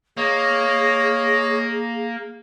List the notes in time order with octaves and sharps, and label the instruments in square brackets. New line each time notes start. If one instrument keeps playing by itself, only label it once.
[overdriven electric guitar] A#3 [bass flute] G#4 [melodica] C#5 D#5